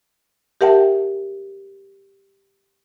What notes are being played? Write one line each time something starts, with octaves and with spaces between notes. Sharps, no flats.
G4 A#4 E5 F#5 G5 A5